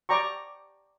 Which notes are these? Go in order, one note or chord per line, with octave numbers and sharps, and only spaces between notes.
D5 G5 A#5 C#6